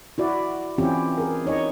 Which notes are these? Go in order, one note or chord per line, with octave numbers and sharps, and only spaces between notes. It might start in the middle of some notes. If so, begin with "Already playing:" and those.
E4 F#4 D5
E3 C4 C#4 E4 F4 G4
G#4 A#4
D#4 C#5 D#5